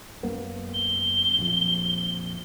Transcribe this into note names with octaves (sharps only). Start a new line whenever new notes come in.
F#2 A#3 B3
G7
A#1 F2